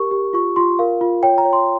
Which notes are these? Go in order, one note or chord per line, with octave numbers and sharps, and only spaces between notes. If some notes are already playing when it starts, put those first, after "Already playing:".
Already playing: G4 A#4 C#6
G4
F4 C#6
F4 C6
A#4 F5
F4
C#5 G5
A#5
C#5
C6